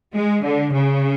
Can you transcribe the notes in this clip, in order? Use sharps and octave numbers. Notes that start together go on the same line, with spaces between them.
G#3
D3
C#3